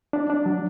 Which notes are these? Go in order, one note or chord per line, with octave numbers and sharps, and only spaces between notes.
D4
D4
F#3